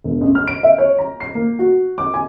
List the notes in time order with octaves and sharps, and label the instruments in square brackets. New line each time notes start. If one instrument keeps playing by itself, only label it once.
[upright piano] E1
A1
F6
D7
E5
C#5
A#5
C7
A#3
F#4
D6
G#5